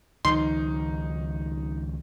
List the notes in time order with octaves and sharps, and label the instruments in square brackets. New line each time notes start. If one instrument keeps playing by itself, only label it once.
[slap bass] C#2 D#3 F3 [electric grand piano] D#4 [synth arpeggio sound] C6